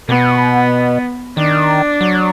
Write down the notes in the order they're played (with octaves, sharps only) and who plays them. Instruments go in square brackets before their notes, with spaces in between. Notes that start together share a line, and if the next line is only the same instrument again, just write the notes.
[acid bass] B2 [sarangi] B3
[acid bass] D#3 [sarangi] D4
[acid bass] F#3